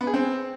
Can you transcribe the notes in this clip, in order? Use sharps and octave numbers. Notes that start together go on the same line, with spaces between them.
B3
G#4
C4